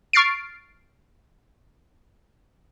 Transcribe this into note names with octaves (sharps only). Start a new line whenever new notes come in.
C#6 F6 A6 C7 D7